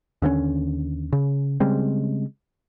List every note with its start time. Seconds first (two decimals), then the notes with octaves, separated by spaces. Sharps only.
0.22 D#2 D3 E3 C#4
1.13 C#3
1.60 C#3 G3 G#3 C4